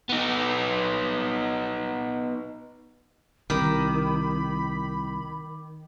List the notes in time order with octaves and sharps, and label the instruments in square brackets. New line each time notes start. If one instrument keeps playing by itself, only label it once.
[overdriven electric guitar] B3 D#4
[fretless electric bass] C2 [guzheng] D#3 [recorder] B5 [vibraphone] D6